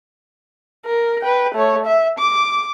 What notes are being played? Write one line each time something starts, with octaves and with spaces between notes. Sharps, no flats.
A#4
B4 G5
A3 C#5
E5
D6